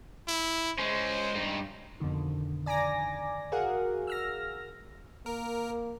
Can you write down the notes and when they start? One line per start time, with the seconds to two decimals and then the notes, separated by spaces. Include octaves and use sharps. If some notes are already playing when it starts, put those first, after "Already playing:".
0.28 E4
0.78 G#3 C#4 C5
1.35 G2 D#4
2.00 F2 B2 D3 D#3
2.66 D5 G#5 A#5 D6 A#6
3.52 F#4 G#4 A#4 F5 F#5
4.07 E6 F6 A#6
5.26 A#3 A#4